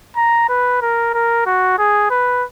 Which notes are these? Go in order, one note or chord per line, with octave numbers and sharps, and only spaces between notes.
A#5
B4
A#4
A#4
F#4
G#4
B4